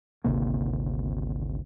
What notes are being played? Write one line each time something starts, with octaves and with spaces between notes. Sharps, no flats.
G#1 D2 C3 A#3